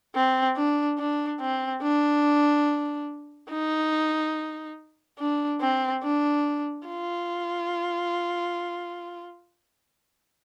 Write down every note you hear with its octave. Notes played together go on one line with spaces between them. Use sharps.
C4
D4
D4
C4
D4
D#4
D4
C4
D4
F4